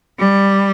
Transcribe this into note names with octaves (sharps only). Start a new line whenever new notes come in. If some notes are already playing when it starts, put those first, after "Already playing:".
G3